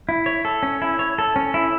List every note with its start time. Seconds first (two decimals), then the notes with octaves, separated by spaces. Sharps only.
0.09 E4
0.26 C#5
0.45 A4
0.63 C#4
0.82 E4
0.99 C#5
1.18 A4
1.36 C#4
1.54 E4